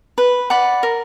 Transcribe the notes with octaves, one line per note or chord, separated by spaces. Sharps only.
B4
D5 F#5 B5
A#4